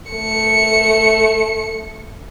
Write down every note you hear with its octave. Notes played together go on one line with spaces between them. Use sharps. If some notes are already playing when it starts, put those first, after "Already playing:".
A3 C#7